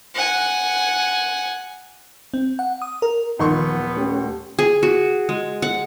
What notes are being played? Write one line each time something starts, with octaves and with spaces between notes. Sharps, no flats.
F#5 G#5
C4
F#5
D#6
A#4
D#1 D#3 F3 B3 C6 C#6
A3 C#4 G4
G#4
F#4
G#3
F#5